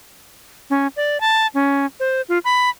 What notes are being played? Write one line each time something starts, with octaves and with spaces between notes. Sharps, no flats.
C#4
D5
A5
C#4
C5
F4
B5